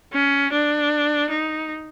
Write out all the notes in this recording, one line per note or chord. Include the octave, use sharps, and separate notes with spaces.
C#4
D4
D#4